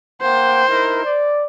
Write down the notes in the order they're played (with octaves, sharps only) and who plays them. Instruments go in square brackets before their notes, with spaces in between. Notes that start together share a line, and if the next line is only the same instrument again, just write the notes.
[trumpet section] A#3 F#5 G5 [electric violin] C5
[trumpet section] D#4 E4 A#4
D5